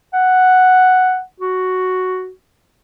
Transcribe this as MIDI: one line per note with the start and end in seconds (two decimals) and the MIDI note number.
0.13 1.19 78
1.40 2.30 66